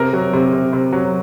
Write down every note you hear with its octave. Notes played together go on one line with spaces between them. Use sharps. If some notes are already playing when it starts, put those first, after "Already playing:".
Already playing: C3 A#4
F#3
C3
C3
C3
F#3